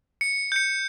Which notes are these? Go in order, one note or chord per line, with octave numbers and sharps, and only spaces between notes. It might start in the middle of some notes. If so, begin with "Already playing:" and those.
C#7
G6 C#7